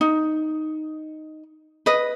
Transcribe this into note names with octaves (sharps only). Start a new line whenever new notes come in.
D#4
B4 D#5